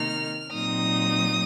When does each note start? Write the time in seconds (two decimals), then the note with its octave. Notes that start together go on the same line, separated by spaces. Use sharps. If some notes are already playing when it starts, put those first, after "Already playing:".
Already playing: C3 D#3 A#3 D#4 F6
0.53 A#2 F#3 C4 D#4 D#6